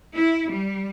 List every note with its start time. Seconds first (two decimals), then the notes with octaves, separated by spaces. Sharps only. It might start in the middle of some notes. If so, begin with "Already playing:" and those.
0.15 E4
0.50 G3